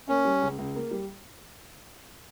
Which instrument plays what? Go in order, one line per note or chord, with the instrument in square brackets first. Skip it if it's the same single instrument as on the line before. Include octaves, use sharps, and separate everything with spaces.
[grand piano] A#3 [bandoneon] C#4
[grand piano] G3
C#2
C#2
A#3
G3